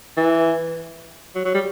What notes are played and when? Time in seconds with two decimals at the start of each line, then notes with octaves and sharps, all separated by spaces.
0.17 E3
1.35 F#3
1.45 F#3
1.54 G3